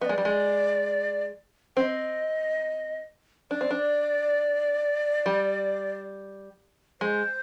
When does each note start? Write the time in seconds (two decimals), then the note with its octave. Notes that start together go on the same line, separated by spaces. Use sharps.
0.01 B3 D#5
0.05 G#3 D5
0.18 G3
0.25 G#3
1.76 C4 D#5 G5
3.51 D4 D5
3.61 C4
3.71 D4
5.26 G3
7.01 G#3 C5